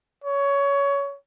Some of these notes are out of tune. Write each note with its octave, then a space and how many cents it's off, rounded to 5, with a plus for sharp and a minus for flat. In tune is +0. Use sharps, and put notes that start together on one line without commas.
C#5 +20